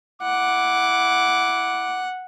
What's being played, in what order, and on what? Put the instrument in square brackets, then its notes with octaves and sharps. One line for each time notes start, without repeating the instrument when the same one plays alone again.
[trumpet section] E4 D6 [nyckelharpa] F#5